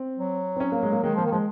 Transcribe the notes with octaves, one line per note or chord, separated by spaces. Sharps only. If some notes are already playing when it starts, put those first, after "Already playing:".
Already playing: C4
F#3
C4
C#4
A#3
G#3
A#3
D#3 G#3
F3 A#3
D#3
F3 G#3